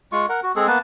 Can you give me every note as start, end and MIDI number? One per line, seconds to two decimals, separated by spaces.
0.12 0.26 56
0.12 0.26 65
0.12 0.26 85
0.29 0.40 70
0.29 0.40 78
0.43 0.52 66
0.56 0.67 56
0.56 0.67 60
0.56 0.67 68
0.56 0.67 69
0.67 0.79 58
0.67 0.79 59
0.67 0.79 71
0.67 0.79 81